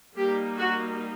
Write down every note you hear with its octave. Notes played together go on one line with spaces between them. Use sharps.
G3 A#3 D#4 G4
F#4